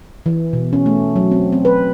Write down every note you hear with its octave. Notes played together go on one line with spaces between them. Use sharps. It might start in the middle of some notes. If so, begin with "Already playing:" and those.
E3
B2
C#4
A3
F#3
C4
C4
B4